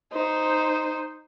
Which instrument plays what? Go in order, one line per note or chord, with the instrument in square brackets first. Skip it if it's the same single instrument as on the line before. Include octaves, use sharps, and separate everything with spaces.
[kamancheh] D#4 C5